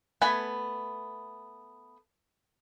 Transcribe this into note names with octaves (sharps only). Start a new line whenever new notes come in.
A3 B3 G#5 B5